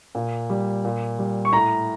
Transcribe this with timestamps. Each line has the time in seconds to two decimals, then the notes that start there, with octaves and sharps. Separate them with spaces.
0.15 A#2
0.50 G3
0.85 A#2
1.19 G3
1.45 C#6
1.52 A2 A#5